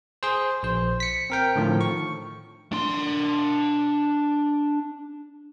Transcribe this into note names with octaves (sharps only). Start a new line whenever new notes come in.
G#4 C5
A#1 C5
B6 C#7
C4 A#4 G5
A2 D3 D#3 F3
C#6
D4 C6